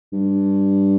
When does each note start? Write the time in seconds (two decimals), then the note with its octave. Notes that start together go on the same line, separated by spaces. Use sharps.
0.13 G2